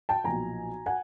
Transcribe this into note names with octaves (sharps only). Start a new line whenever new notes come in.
G5 A5
B1 A#2 F3 G#5 A#5
F#5 G#5